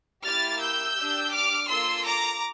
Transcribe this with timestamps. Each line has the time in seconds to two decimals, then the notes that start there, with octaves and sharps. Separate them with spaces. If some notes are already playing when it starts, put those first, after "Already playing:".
0.24 A#3 E4 G4 F6 A6
0.60 E6 G6
0.96 D4 G4
1.32 D6 F6
1.68 A#3 F4 A4 C6 E6
2.04 A#5 D6